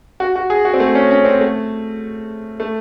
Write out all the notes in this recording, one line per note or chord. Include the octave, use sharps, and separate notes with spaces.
F#4
F#4
G#4
F#4
C4
A3
C#4
C#4
C4
A3
A3